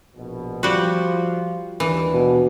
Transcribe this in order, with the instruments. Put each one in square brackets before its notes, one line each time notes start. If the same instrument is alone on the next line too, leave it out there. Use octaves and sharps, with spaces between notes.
[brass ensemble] A#1 B2
[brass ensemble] F3 F4 [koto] G3 F#4
[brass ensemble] D#2 D4 [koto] E3
[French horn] B2